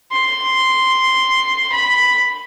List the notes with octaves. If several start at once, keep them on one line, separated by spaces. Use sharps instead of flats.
C6
B5